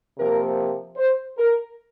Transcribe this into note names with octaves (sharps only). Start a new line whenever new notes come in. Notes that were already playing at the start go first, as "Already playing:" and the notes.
C3 F3 A#3 A#4
C5
A#4